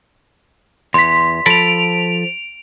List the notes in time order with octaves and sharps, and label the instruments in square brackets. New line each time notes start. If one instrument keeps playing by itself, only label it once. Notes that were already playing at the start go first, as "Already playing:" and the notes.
[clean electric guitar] E2 [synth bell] C6 B6
[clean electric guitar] F3 A4 B5 [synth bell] D7 F7